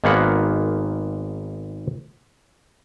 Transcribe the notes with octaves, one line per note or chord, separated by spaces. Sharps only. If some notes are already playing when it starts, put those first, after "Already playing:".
G#1 D#3 G#3 A#3 B3 F#5